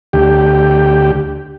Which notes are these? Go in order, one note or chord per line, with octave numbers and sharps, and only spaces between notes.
D2 G4